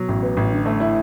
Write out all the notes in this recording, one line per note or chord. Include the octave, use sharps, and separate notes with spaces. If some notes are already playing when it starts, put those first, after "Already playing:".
Already playing: B2 F#3
A1
B3
A1
D3
A3
E4